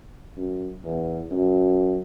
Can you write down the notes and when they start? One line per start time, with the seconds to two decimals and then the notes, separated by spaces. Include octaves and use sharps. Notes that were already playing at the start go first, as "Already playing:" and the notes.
0.37 F#2
0.84 E2
1.31 F#2